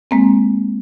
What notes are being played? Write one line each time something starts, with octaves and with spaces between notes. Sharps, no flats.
G#3 A#3 C4